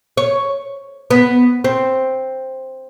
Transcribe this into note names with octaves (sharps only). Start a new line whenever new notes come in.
C#5
B3
C4